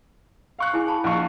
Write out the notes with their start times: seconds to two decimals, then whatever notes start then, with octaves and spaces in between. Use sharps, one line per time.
0.59 F5 C#6 F#6
0.74 E4 G#4 G#5
0.87 G#4 A5 B5
1.04 A#1 F5 C#6